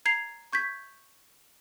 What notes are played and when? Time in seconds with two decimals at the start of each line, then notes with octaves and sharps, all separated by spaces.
0.05 A#5 G#6 C7 F7
0.53 C#6 G6 G#6 B6